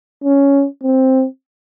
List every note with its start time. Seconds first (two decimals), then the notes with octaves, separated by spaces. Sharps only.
0.24 C#4
0.83 C4